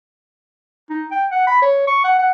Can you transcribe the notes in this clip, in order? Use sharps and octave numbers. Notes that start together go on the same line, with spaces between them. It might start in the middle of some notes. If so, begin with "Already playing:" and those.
D#4
G5
F#5
B5
C#5
C#6
F#5
F#5